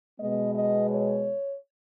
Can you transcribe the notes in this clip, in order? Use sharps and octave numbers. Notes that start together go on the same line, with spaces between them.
B2 G#3 B3 D#5
D#5
C#5